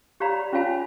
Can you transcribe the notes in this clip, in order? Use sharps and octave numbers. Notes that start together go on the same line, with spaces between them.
G4 C#5 D5 F5 A#5 B5
C#4 F4 C#5 F5 G#5 B5